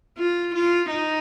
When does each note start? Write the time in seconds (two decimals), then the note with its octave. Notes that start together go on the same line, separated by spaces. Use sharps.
0.18 F4
0.55 F4
0.90 D#4